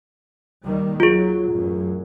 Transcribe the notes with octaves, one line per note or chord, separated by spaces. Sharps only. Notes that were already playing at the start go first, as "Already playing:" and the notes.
D#2 D#3 G3
F#3 F4 G#4
A1 F#2